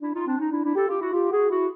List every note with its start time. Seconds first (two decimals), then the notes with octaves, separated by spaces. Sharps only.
0.01 D4 E4
0.14 D#4 F4
0.26 C4 D4
0.38 C#4 D#4
0.50 D4 E4
0.64 D4 E4
0.75 G4 A4
0.88 F4 G4
1.01 E4 F#4
1.12 F4 G4
1.31 F#4 G#4
1.50 E4 F#4